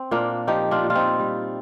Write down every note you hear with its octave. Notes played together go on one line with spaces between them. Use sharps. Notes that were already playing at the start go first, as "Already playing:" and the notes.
Already playing: C4
A#2 A#3 D4
F3 D#4 G4
D4 F4
A#2
F4
C4 D#4
G3